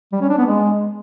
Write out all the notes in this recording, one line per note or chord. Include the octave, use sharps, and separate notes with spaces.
G3
C#4
D4
B3
G#3